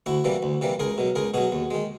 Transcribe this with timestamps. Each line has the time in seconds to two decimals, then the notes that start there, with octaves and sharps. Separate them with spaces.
0.06 D2 E4 F#4
0.24 C3 E3 G3 A#3
0.43 D2
0.61 C3 E3 G3 A#3
0.79 C#2 G#4 A#4
0.98 B2 F#3
1.15 C#2 G#4 A#4
1.34 B2 F#3 F#4 G#4
1.52 D#2
1.71 D#3 G#3